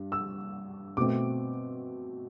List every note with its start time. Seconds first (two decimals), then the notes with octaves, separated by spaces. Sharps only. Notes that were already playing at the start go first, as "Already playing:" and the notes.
Already playing: G2
0.12 E6
0.97 B2 A3 C4 D6